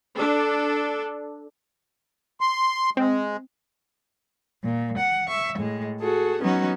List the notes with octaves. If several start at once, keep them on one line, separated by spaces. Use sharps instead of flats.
D4 A4
C6
G#3 C4
A#2
F#5
E5 C#6
A2 G#3
F#4 G#4 A4
F#3 B3 C#4 D#4 F#4